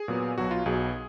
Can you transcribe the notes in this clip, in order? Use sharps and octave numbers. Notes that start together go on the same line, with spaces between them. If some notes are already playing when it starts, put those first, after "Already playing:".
Already playing: G#4
A#2 F#3 B3
B1 B2 F#3 F#4
F4
B1 B2 F#3 B3 G#4